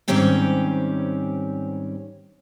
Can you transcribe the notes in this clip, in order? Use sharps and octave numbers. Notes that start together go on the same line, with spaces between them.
G#2 D#3 G3 C4 C#4 G4